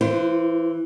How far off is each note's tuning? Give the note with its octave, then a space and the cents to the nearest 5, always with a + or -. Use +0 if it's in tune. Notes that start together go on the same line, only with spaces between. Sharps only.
E3 +5 F4 -45 C5 +0